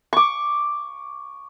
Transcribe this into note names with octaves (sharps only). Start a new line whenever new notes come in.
C#6 D6